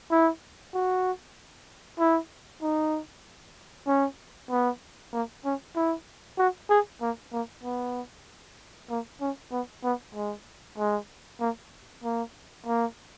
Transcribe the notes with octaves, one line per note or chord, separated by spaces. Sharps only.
E4
F#4
E4
D#4
C#4
B3
A#3
C#4
E4
F#4
G#4
A#3
A#3
B3
A#3
C#4
B3
B3
G#3
G#3
A#3
A#3
A#3